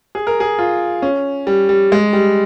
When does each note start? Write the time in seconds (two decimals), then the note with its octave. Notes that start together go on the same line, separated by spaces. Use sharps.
0.15 G#4
0.27 A#4
0.40 G#4
0.59 F4
1.02 C#4
1.47 G3
1.69 G3
1.92 G#3
2.13 G3